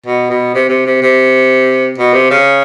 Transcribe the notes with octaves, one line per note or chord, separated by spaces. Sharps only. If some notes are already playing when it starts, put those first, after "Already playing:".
B2
B2
C3
C3
C3
C3
B2
C3
C#3